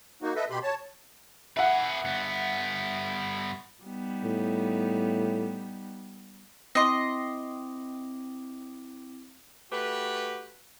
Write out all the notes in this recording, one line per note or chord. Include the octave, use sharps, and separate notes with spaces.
A#3 D#4 F#4
A4 B4 D#5 E5
B2 G4 B5 C6
C#5 A5
G#4 B4 E5 F#5
G2 B3
G3 B3 D#4
A2
C4 E4 D#5 C6 D6
A3 F#4 G4 B4